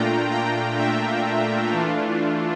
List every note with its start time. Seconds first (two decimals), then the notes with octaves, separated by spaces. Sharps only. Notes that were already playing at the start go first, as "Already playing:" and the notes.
Already playing: A#2 A3 D4 F4 G5 A#5
0.31 G5 A#5
0.78 E5 G5
1.72 E3 A3 D4 F4